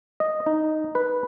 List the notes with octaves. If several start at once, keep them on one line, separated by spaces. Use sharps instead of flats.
D#5
D#4
B4